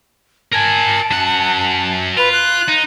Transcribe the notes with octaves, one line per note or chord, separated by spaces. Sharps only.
A#4 G#5 A5
F#2 F#5
F4 B4
F#6
D#4